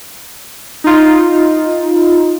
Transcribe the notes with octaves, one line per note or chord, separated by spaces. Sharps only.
D#4 F4